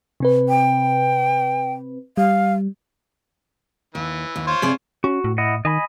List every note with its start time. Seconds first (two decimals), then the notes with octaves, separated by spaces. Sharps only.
0.20 C3 C4 B4
0.49 G5
2.17 G3 F5
3.95 D#2 E3
4.36 D#2
4.47 F4 C5 C#5
4.62 C3 G#4 D5
5.04 C#4 F#4
5.24 A2
5.38 E4 D#5 F#5
5.65 D#3 D#5 G#5 B5